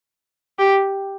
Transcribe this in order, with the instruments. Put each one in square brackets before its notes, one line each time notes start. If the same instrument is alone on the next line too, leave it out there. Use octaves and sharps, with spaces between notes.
[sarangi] G4